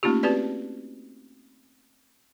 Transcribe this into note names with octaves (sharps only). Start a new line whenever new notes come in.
A3 A#3 C#4 D#4 F4 G4
C4 F#4 G4 B4 D5 A5